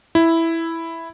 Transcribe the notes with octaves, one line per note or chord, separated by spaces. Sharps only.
E4